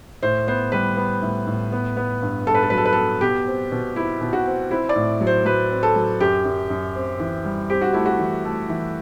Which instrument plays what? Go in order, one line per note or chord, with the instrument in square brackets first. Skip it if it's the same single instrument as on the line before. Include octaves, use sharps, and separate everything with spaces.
[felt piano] A2 C5
B3 C5
G3 B4
B3
A2
A2
B3
B3
G2
G2 A4
B4
A4
F#3 B4
A4
B4
B3 A4
B2 G4
C4
B2
C4 E4
B2
F#4
C4
C4 E4
D5
A2
F#3
C5
F#3 B4
C4
A4
F#3
F#2 G4
F#2
F#2
C4
E3
G3
C4 G4
F#4
A3 E4
F#4
E3
A3
E3